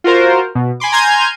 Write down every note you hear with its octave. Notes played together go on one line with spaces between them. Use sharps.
F4 F#4 A#4 C5
B2
G#5 B5 C6 D6
G#5 A#5 C6 F6 G6 G#6